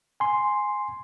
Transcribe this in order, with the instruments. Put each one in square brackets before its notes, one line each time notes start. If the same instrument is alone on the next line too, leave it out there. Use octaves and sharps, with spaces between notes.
[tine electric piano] G#5 C6